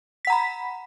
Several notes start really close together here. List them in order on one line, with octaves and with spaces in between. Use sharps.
B6 F#5 A#5 B5